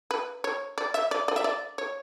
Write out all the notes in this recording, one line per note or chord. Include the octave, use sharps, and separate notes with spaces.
B4
C#5
D5
E5
D5
D5
E5
D5
C#5